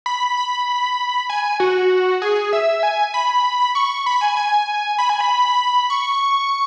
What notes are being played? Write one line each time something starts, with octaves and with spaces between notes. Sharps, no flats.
B5
B5
G#5
F#4
G#4
E5
G#5
B5
C#6
B5
G#5
G#5
B5
G#5
B5
C#6